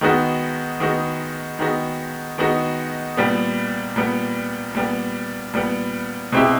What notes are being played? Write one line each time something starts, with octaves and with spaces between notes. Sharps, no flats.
D#3 G#3 B3 D#4 F#4
D#3 G#3 B3 D#4 F#4
D#3 G#3 B3 D#4 F#4
D#3 G#3 B3 D#4 F#4
A#2 G3 B3
A#2 G3 B3
A#2 G3 B3
A#2 G3 B3
B2 G#3 C4 E4 G4